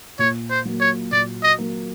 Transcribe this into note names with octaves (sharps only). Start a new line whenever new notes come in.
A#2 C#5
C5
F#3 A#3
C#5
A#2 D5
D#5
F#3 A#3